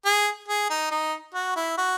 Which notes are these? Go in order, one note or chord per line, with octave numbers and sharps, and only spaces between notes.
G#4
G#4
D#4
D#4
F#4
E4
F#4